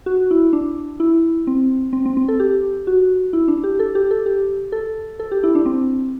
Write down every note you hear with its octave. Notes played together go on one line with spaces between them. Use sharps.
F#4
E4
D4
E4
C4
C4
C4
C4
A4
G4
F#4
E4
D4
G4
A4
G4
A4
G4
A4
A4
G4
E4
D4
C4